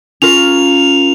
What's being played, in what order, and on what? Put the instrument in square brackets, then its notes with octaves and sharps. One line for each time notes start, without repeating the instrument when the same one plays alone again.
[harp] C#4 F4 A#4 [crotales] F7